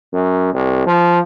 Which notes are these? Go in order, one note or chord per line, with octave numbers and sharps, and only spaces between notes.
F#2
C2
F3